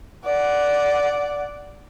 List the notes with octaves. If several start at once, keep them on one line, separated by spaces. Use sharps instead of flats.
D5 F#5